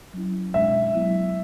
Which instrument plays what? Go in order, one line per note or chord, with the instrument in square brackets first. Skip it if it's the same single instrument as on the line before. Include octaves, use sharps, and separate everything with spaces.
[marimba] F#3 C#4 E4
[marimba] B2 G#3 D4 [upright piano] E5
[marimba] F#3 B3 E4